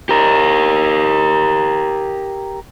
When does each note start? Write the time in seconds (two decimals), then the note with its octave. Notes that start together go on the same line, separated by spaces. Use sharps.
0.09 G4 A#4